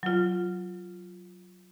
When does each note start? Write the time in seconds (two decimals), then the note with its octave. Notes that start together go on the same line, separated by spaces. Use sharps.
0.03 F#3 F4